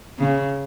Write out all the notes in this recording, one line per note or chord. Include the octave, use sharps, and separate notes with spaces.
C#3